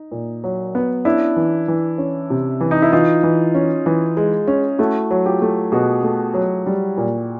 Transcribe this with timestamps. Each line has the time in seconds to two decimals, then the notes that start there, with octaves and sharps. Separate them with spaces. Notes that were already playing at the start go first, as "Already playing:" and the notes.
Already playing: D#4
0.12 A#2
0.44 F#3
0.75 B3
1.05 C#4 D4 E4
1.36 E3
1.68 E3
1.98 C#4
2.30 C3
2.61 E3
2.71 D#4
2.82 E4
2.92 E3 D#4 F4
3.23 E3
3.55 C#4
3.86 E3
4.17 G#3
4.47 C#4
4.79 A3 E4 F#4
5.11 F#3
5.26 F4 G4
5.42 A3
5.72 B2 F#4 G#4
6.03 A3
6.34 F#3
6.66 G3
6.98 A#2